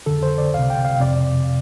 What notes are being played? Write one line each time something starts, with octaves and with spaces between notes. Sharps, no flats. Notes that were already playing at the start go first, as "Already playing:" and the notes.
F2 D3 A4
C5
D5
C2 C3 F5
G5
F5
F2 C3 D5